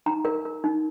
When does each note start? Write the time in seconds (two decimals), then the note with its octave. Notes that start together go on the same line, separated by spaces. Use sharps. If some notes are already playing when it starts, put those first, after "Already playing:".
0.06 D#4 A#5
0.25 A#4
0.45 A#4
0.64 D#4